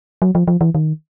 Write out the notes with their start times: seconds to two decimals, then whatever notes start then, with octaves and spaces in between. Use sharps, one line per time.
0.22 F#3
0.35 F3
0.48 F3
0.61 E3
0.75 D#3